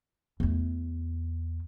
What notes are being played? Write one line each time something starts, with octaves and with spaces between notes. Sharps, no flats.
E2 A3